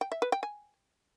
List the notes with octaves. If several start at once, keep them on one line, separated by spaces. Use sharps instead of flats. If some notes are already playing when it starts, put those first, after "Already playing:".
G5
E5
B4
G5
G#5